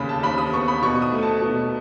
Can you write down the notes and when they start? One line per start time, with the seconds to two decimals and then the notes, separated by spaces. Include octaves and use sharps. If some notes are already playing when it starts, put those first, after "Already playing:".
Already playing: D#2 C#3 B5
0.09 A5
0.23 D#2 B5
0.38 D#6
0.53 B3 C#6
0.68 B5
0.82 B2 C#6
1.02 D#6
1.12 A3
1.23 A5
1.42 B2